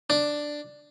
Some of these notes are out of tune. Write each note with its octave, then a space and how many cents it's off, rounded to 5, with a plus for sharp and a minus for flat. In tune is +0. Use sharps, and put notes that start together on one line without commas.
D4 +5